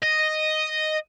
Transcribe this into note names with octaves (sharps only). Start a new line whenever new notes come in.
D#5